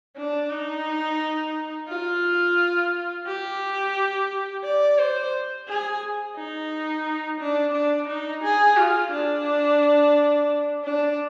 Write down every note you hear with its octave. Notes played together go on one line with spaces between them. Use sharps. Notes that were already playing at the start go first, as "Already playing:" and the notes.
D4
D#4
F4
G4
D5
C5
G#4
D#4
D4
D4
D#4
G#4
F4
D4
D4